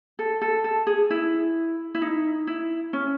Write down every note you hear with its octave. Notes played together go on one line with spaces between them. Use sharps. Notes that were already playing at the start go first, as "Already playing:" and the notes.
A4
A4
A4
G#4
E4
E4
D#4
E4
C#4